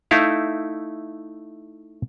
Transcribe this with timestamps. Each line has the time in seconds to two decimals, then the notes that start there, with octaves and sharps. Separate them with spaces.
0.11 A3 D#4 E4 F5